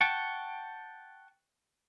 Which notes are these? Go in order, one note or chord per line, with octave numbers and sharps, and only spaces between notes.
F#5 G5 A5 C#6